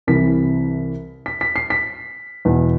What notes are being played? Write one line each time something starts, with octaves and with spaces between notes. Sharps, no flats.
C2 C3 E3 B6
B6
B6
C7
B6
E2 B2